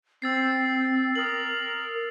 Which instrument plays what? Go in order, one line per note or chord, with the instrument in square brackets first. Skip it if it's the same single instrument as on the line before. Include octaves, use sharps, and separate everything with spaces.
[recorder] C4 [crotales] E6 A6 C7
[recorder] A#4 [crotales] D#6 F#7